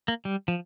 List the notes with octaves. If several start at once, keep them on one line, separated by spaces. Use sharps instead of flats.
A#3
G3
F3